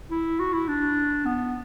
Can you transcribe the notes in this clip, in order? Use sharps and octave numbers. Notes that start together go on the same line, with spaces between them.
E4
F#4
E4
D4
B3